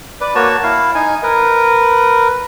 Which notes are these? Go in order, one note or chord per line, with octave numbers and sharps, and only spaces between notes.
B4 D5
A#3 F#4 C#5 A5
E4 F5
D#4 G#5
A#4 B4